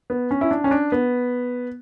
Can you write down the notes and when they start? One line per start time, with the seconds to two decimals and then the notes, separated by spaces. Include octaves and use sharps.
0.10 B3
0.31 C#4
0.41 E4
0.51 D4
0.64 C#4
0.71 D4
0.92 B3